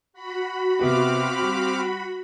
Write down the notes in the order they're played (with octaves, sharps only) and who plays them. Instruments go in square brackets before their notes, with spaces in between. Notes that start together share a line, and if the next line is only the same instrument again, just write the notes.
[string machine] F#4 B5
[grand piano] C3 B3 G4 [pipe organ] C4 F5 D6
[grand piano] G3